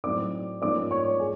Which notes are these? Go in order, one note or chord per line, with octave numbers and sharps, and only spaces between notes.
A2 F#3 A3 C4 D#4 D5 D6
G#2 F3 A#3 C#4 D5 D6
C#5 C#6
G#4 G#5